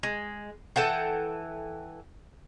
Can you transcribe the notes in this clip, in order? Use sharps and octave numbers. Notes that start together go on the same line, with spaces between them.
G#3
E3 A4 F#5 G5